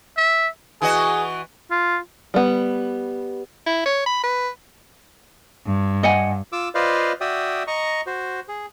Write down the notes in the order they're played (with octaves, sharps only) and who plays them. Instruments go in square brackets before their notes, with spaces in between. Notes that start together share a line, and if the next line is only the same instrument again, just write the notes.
[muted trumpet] E5
[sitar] E3 F#4 D#5 [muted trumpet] G#4
[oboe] F4
[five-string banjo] G3 B3
[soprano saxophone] E4
C#5
B5
B4
[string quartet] G2
[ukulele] D#5 F#5 G#5
[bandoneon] F4 D6 E6
F4 B4 C5 D5 D#5 F5
F#4 D5 E5 G5 D#6
D#5 A#5 C#6
F#4 C5
G#4